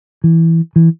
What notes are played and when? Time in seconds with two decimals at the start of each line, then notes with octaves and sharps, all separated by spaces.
0.24 E3
0.76 E3